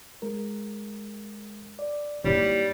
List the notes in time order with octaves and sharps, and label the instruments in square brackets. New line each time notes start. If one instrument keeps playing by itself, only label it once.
[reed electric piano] G#3 A#4
D5
[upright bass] G#2 D#4 [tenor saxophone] G3 [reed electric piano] A#3 E4 C#5